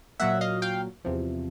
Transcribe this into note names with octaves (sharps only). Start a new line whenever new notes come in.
A#2 F#3 A#3 E5 F#5
D#5 F5
F5 G5
E2 C3 F3